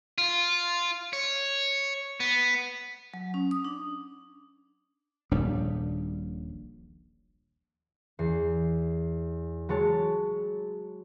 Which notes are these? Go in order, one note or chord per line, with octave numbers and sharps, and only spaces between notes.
F4
C#5
B3
F#3
C#4
D#6
D4
D#1 A#1 G3 D4
E2 C7
F#3 G#3 C#5 A5